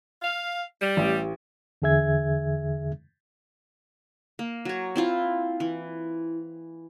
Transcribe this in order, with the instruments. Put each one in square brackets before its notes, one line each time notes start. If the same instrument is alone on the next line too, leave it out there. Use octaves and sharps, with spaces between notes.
[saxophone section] F5
G3
[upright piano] A1
[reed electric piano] E2 D3 G#4 E5 G#6
[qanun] A#3
F#3 C#5
C4 E4 F4
E3